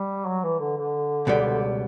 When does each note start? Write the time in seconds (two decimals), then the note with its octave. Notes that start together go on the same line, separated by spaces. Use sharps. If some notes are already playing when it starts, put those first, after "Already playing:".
Already playing: G3
0.26 F#3
0.43 E3
0.60 D3
0.77 D3
1.27 C#2 B2 G3